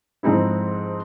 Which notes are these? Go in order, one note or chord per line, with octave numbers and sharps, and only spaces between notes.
F2 G#2 C4 D#4 E4